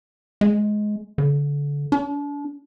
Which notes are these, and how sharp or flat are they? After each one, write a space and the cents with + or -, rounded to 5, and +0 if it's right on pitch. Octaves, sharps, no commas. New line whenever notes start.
G#3 +15
D3 -30
D4 -35